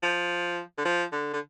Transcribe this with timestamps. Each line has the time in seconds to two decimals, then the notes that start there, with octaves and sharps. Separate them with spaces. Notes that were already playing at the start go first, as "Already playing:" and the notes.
0.03 F3
0.78 D3
0.85 F3
1.12 D3
1.34 D3